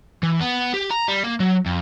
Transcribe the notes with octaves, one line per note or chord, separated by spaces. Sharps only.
E3
B3
G4
A#5
G3
A#3
F#3
F2